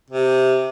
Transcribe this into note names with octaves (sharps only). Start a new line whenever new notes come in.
C3